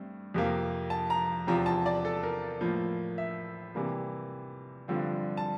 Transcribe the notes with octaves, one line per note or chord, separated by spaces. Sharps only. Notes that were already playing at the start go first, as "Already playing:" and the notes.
Already playing: G2 A3 C4
F2 C3 F3 A#3
A5
A#5
E2 C3 F3 C4 A#5
A5
D5
A4
A#4
A2 F3 A#3
E5
C3 E3 G3 A#3
G2 D3 F3 C4
A5